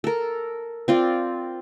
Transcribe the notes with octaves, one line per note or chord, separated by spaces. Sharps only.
A4 A#4
C4 F4 D5